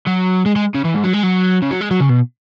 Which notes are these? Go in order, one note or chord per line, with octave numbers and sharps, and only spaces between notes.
F#3
G#3
G#3
C#3
E3
G#2
F#3
G#3
F#3
C#3
F#3
G#3
F#3
C#3
B2